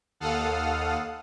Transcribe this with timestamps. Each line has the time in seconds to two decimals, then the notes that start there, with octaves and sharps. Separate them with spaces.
0.20 D#2 A4 F5 F#5 D#6 F6